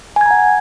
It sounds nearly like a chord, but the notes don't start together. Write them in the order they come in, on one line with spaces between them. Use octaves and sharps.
G#5 G#6 A#5 F#5